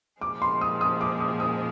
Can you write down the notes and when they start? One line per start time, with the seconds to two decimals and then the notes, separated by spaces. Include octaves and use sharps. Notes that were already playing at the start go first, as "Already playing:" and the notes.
0.21 A#2 F3 G#3 D6
0.42 C6
0.61 D#6
0.81 D#6
1.01 D6
1.20 D#6
1.40 D#6